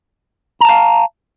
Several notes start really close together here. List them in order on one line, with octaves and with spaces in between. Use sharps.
A#5 A5 F5